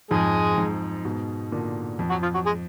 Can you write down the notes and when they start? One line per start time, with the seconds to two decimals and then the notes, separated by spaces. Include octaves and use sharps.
0.11 F2 G#2 G#3 G#4
0.58 F2 G#2
1.05 G#2 B2
1.52 A#2 D3
1.99 F2
2.10 F#3 F#4
2.22 F3 F4
2.35 F#3 F#4
2.45 G#3 G#4